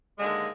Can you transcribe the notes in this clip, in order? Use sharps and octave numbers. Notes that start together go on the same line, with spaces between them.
D#2 D3 G#3